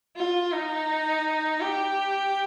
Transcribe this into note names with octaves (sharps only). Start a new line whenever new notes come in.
F4
D#4
G4